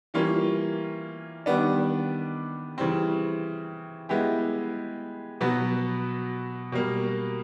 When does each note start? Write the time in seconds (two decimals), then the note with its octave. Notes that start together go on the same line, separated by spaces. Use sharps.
0.14 E3 G3 A#3 C#4 F4
1.46 D#3 G3 B3 D4
2.78 C#3 E3 G3 C4
4.09 G#3 B3 E4 G4
5.41 B2 F#3 B3
6.72 B2 G3 A#3